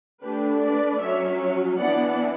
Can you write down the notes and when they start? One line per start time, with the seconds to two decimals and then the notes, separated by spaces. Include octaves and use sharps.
0.22 D3 A3 D4 G4 B4
0.62 B4 D5
1.00 F#3 C#4 C#5 E5
1.78 E3 B3 D4 D5 F#5